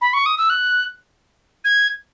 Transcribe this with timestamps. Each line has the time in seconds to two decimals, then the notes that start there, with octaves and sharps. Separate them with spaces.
0.01 B5
0.14 C#6
0.26 D#6
0.38 E6
0.50 F#6
1.65 G#6